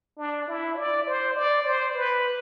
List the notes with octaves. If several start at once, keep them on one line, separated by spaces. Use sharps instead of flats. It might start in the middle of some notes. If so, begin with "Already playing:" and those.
D4
E4
D5
C5
D5
C5
B4